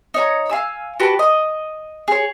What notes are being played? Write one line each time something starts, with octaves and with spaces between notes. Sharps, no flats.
D#4 C#5 A#5
F5 G#5 E6
F#4 G4 B4 A5
D#5
G#4 C#5